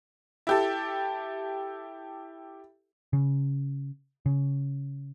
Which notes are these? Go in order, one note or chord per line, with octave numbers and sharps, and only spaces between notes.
E4 G4 A4
C#3
C#3